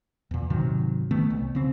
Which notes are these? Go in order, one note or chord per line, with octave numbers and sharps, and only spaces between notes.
E2 A#2
G#2 C3 D#3 F#3
D#3 A3 B3
C2
C#3 C4